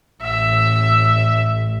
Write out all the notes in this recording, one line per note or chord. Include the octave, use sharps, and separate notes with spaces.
A1 E5 E6